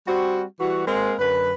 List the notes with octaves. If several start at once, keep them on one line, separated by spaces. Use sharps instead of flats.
G3 C4 F#4
E3 G3 F#4
G#3 A#3 C4 A#4
F#2 D3 B4